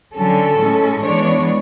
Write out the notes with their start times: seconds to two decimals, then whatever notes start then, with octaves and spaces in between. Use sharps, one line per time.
0.14 D3 F#3 C#4 A4
0.59 A2 G#3 C#4
1.03 E3 G#3 B3 D4 C#5